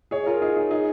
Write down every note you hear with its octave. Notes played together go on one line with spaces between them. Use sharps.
G#4 C#5
F4 A#4
D#4 G#4
D#4 G#4
D#4 G#4